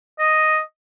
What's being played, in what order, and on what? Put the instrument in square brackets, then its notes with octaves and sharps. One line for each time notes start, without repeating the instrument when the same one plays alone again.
[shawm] D#5